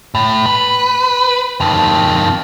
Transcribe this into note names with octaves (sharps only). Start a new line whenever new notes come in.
A2
B4
F2 D#3